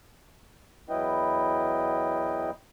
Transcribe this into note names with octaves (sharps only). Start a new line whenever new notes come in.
E2 F#3 E4 B4 D#5 G5